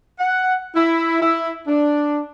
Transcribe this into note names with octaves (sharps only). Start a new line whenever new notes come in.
F#5
E4
E4
D4